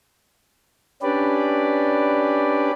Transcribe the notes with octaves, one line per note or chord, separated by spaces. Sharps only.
C#4 D4 G4 B4 D5